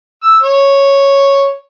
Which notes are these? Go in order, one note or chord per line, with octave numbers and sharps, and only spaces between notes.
E6
C#5